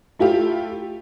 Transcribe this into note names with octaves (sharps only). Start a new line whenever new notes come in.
A3 E4 F4 G4